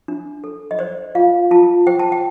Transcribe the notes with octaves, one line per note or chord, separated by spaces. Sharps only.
D4
A4
D#5
C5 D5
F4 F5
F4 A5
C5 G5
A5
G5